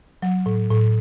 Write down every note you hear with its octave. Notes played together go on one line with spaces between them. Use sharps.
F#3
A2
A2